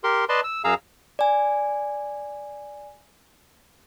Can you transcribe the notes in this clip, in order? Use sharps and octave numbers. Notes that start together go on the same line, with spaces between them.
G4 A#4 C6
B4 D5 D#5 A5 C6
E6
F#2 G#4 F5 A#5 E6
D5 G#5